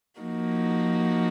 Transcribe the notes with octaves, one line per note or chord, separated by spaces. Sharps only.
F3 A#3 D#4 F#4